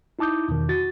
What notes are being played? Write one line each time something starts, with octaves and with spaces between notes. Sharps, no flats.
D#4 E4 A5 D6 D#6 G6
E2 B2 D#3
F#4 A6